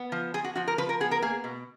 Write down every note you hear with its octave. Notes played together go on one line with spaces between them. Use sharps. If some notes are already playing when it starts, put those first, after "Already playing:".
Already playing: B3
F3
F3 G#4
F#4
F3 F#4
A#4
F3 B4
A#4
B3 G#4
A#4
A#3 G#4
B2